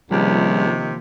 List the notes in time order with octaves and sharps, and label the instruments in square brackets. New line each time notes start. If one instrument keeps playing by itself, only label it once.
[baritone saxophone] C#2 [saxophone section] C3 D#3 [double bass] F3 A#3 [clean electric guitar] G3